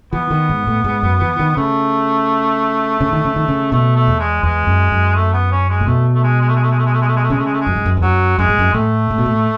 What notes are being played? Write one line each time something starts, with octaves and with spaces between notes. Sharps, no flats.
E3 B3
D#3
G#2
A2
G#2
F#2
E3
D#3
C#3 A3
C#3
D#3
C#3
D#3
C#3
B2 A3
A3
E2
G#3
E2 G#3
F#2
F#2
A3
B3
C#4
G#3
A2
B2 A3
A3
G#3
G#3
A3
G#3
A3
G#3
A3
G#3
A3
G#3
A3
G#3
A3
C#3 G#3
A3
G#3
A3
G#3
F#2
G#2
F#2
E2
F#2 F#3
F#2 G#3
G#2
F#2
A2 A3
A2
B2
A2